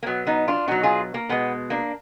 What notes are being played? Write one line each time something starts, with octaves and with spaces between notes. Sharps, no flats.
A#3
B2 F#3 B3
B3 D#4
D4 F4
B2 F#3 D#4 F#4
F4 G#4
A#3
B2 G#3 B3
A#3 D4